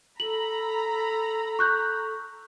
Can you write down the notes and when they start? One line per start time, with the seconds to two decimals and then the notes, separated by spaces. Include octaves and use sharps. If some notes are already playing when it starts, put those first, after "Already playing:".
0.20 A4 A#5 B5 F#7
1.59 C#6 F#6 G6